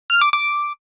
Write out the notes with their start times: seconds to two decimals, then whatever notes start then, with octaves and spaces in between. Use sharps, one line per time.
0.10 F6
0.21 D6
0.33 D6